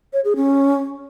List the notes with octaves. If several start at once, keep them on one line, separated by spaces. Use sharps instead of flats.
C#5
G#4
C#4